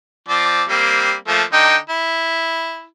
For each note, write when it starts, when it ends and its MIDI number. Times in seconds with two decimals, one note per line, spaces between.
0.28 0.63 53
0.28 0.63 60
0.28 0.63 74
0.69 1.13 55
0.69 1.13 58
0.69 1.13 60
1.28 1.43 53
1.28 1.43 57
1.28 1.43 58
1.53 1.76 50
1.53 1.76 63
1.53 1.76 79
1.90 2.84 64